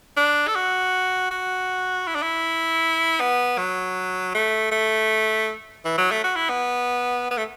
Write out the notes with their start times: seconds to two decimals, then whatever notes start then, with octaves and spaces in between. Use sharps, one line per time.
0.16 D4
0.47 A4
0.55 F#4
1.30 F#4
2.07 E4
2.15 D4
2.22 E4
3.20 B3
3.58 F#3
4.34 A3
4.71 A3
5.85 E3
5.97 F#3
6.11 A3
6.23 F#4
6.35 E4
6.49 B3
7.30 B3
7.37 A3